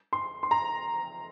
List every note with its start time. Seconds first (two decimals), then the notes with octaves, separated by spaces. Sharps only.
0.13 C6
0.43 C6
0.51 A#5